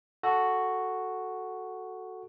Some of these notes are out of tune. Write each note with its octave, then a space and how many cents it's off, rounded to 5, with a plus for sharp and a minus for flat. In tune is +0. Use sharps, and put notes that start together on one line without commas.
F#4 +0 A4 +0